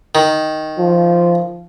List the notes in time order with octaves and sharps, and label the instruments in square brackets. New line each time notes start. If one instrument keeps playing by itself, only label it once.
[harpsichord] D#3
[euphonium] F3